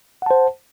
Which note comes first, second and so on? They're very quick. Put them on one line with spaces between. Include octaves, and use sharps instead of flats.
F#5 A5 C5